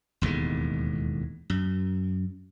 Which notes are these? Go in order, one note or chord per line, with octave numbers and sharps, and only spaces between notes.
E1 D#2 A2 G#3
F#2